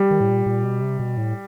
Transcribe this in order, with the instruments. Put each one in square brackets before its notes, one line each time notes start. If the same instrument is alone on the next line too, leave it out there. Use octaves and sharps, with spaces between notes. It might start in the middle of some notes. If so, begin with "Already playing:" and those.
Already playing: [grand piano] G3
[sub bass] D#3
A2
A#2
A#2
B2
C3
B2
A2